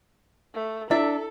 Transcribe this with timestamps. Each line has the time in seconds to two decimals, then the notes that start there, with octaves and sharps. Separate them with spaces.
0.55 A3
0.91 D4 E4 A4 E5